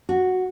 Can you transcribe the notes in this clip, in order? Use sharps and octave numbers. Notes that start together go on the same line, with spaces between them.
F#4